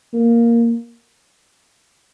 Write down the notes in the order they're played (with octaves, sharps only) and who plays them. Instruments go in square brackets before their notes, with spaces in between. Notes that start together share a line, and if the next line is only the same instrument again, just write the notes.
[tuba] A#3